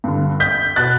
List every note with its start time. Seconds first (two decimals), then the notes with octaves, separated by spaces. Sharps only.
0.04 G2 D3
0.40 G6 B6
0.76 B2 F#6 A6